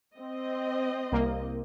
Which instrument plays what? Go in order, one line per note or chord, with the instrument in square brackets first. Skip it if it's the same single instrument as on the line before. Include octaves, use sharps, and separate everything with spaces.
[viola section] C4 D#5
[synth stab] C2 A#3